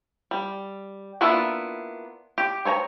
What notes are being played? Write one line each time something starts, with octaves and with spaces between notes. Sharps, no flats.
G3
A#3 B3 D4 E4 F4
G4
C5 C#5 G#5 A#5